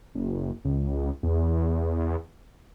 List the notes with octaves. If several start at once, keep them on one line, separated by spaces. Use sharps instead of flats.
F#1
C#2
E2